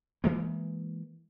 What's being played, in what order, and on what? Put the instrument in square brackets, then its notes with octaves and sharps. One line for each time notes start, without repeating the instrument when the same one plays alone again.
[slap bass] E3 G#3 A#3